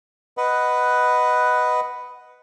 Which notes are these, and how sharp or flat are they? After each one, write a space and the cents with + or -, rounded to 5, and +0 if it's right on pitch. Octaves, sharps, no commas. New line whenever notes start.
B4 +5 D#5 +0 F#5 +5